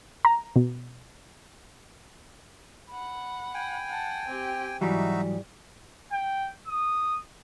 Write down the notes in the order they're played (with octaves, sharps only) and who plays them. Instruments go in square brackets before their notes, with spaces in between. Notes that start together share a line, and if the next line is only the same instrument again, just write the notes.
[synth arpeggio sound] A#5
B2
[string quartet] F#5 B5
[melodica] G5 G#5
[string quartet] F#5 A5
C4 G4
[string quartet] G#2 [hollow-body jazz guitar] E3 F#3 G3 [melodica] D#4 F#4 E5
[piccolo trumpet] G5
D#6